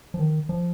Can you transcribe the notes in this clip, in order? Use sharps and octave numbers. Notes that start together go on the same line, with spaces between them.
F3
D#3
F3